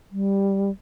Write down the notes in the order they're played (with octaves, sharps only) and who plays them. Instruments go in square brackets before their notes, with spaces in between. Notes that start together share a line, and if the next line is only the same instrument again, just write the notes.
[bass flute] G3